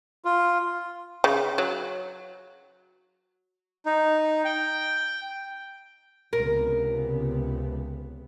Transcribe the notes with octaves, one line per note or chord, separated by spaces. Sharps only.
F4
C#3
F#3
D#4
G5
C#2 C3 B3 A#4